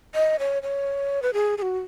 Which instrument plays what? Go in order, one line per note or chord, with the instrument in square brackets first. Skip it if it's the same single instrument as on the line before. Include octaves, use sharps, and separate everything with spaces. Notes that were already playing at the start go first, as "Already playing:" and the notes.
[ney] D#5
C#5
C#5
B4
G#4
G#4
F#4